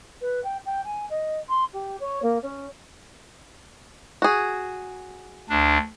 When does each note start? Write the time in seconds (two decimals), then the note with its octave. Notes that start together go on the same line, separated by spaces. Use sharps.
0.21 B4
0.43 G5
0.65 G5
0.84 G#5
1.09 D#5
1.48 C6
1.72 G4
1.99 C#5
2.22 A#3
2.42 C#4
4.22 F#4 G#4
5.49 D2 D4